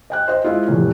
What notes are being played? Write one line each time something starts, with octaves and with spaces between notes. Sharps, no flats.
D#5 G5 F#6
C5 D#5
G#3 E4 F4
F1 E2 A2